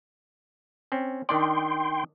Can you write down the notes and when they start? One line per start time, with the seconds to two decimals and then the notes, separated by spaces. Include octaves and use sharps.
0.92 C4 C#4
1.29 D#3 D4 D5 G5 C6